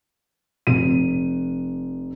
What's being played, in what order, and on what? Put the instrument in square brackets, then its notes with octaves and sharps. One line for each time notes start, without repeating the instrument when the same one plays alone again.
[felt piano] F1 D#7